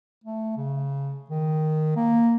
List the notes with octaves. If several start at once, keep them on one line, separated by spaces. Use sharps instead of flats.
A3
C#3
D#3
A#3